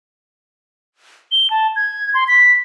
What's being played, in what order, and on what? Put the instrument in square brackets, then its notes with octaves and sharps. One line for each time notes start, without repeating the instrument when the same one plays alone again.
[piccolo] G7
A5
G#6
C6
B6